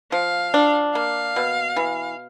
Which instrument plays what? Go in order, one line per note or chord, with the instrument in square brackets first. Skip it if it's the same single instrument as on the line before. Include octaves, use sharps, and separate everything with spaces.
[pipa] F3 [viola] F5
[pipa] D4
[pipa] A#3 [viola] F5
[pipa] B2
E3